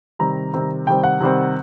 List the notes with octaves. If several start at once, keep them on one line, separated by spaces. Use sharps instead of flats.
C3 D#3 G3 C4 A#5
C3 D#3 G3 C4
C3 D#3 G3 C4 G5
F#5
C3 D#3 G3 C4